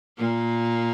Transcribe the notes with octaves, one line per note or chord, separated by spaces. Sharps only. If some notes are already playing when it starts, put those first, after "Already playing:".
A#2 A#3